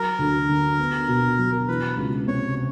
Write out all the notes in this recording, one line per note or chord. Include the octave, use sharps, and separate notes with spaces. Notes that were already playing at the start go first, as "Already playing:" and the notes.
Already playing: F#3 A#4
D2
D3
B3
B2
F#3
E3 B4
C#2
C3 C#5